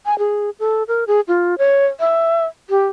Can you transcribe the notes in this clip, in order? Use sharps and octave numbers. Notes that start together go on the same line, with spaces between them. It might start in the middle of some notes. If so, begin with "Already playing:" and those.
G#5
G#4
A4
A#4
G#4
F4
C#5
E5
G4